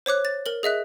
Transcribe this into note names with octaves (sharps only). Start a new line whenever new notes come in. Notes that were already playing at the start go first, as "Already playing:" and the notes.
C5 C#5 D6 F#6
A6
A#4 F#7
G#4 D#5 E5 F#6